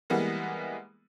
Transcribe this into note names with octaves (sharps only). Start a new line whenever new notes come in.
E3 G3 G#3 A#3 B3